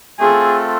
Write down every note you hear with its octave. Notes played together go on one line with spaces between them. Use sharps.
A3 C4 F4 G#4 A4